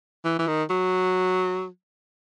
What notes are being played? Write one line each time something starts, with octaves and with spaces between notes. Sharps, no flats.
E3
E3
D#3
F#3